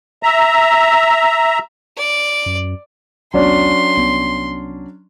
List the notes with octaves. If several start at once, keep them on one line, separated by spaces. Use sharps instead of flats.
E5 A#5
D5
F#2
B1 E2 F#3 B3 C#4 D4 C6
C2 B3